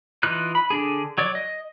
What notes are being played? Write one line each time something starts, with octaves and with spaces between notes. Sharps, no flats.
E3 D#4 F4 F#6
B5
D3 D4 G#4
F#3 C#5 D5
D#5